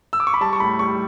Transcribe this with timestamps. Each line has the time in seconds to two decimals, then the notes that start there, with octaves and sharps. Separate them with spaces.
0.13 E6
0.20 D6
0.27 C#6
0.34 B5
0.41 G3 A5
0.53 C#6
0.60 A2 B5
0.79 G3 C#6